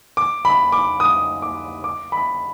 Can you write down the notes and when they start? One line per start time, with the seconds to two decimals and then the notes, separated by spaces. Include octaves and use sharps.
0.17 D6
0.45 B5
0.72 D6
1.00 D#6
1.42 D6
1.84 D6
2.12 B5